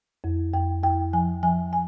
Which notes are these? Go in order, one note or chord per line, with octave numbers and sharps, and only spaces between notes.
F2
F2 G5
F2 G5
F3 G#5
F3 G#5
G#5